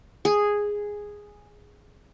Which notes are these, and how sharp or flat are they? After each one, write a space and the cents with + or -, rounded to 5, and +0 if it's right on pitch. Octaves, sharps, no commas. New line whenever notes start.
G#4 -5